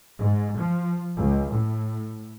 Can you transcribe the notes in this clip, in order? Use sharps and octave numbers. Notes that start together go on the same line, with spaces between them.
G#2
F3
C#2
A2